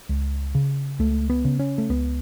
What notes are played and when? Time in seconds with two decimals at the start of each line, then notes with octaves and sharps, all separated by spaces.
0.09 C#2
0.55 C#3
0.99 C#2 A3
1.30 B3
1.45 C#3
1.59 C#4
1.78 A3
1.90 C#2 B3